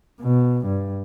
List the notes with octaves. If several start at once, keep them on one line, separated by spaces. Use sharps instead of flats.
B2
G2